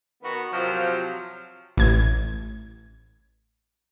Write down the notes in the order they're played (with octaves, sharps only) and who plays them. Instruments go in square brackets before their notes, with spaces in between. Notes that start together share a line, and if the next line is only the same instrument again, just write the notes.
[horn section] D#3 B3 F#4
C3 F3 F#3
[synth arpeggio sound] A1 G#6